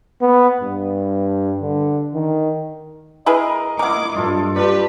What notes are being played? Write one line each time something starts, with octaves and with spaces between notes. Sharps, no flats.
B3
G2
D3
D#3
E4 G#4 A#4 B4 D#5
E4 A#4 F#5 C#6 D6
G2 F4 A4
D4 F4 G4 B4